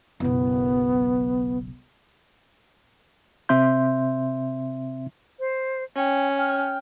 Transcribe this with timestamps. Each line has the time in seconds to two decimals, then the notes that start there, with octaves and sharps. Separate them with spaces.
0.20 F#1 B1 B3
3.49 C3 C4 E5 C6 G6
5.38 C5
5.96 C#4 G5
6.36 G5 F6